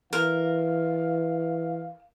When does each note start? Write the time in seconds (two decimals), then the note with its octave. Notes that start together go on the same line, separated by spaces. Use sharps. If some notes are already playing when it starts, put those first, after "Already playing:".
0.13 E3 A#4 F5